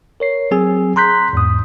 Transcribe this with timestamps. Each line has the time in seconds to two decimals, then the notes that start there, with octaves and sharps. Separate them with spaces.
0.20 A#4 C#5 C7
0.51 F#3 C4 G#4 G#5 E6
0.96 A#5 C6 F#6 G6 B6
1.33 E2 G#2 D#6